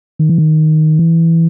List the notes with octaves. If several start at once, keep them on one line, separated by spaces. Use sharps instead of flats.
D#3
E3
D#3
E3